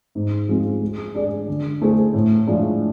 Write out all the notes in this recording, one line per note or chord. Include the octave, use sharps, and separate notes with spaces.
G#2
F3 G#3 C4 F4
G#3
D4 G#4 D5
D3
A3 E4 G#4 C5
A2
F3 G#3 D4